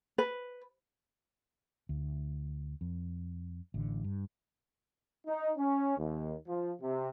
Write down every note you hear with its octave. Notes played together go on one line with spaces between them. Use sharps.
B4
D2
F2
A1 D3
G2
D#4
C#4
D#2
F3
C3